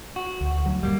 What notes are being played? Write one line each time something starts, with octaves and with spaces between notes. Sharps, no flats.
F#4
D2
D2 F#3
D#1 G2 G3 A#3